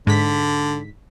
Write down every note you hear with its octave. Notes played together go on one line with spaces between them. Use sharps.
G#2 D3 B6